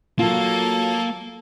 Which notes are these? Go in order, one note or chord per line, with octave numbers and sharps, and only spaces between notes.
F#3 A#3 F4 A4